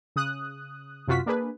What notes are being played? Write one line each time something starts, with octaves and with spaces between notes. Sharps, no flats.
C#3 D#6 F#6
F#2 C3 F4 F#4 B6
A#3 D4 G#4 B4